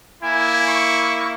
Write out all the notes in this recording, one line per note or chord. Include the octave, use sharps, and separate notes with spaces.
A#3 E4 G#5
C#6